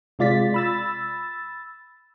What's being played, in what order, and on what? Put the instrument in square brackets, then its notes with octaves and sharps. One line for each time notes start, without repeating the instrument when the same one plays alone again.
[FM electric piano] C3 G#3 F4 D5 A6 B6
B5 E6 A6